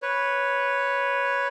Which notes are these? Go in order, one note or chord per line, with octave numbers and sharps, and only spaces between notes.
B4 C#5